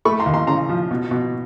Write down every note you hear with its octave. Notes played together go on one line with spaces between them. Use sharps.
A3 B5 C#6
A#5 C6
D#2
A#5 C6
C#3 A#5 C6
F3
B2
B2